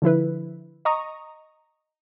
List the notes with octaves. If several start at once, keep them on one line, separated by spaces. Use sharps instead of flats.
D3 F3 E4 B4
D#5 A#5 C#6 D#6